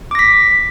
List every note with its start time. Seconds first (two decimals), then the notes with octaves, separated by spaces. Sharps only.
0.11 D6
0.15 A#6
0.19 B6